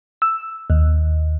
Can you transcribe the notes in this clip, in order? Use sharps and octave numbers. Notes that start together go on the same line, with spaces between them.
E6
D#2